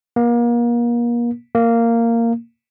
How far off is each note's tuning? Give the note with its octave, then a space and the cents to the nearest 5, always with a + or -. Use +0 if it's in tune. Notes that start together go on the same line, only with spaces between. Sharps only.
A#3 +35
A#3 -10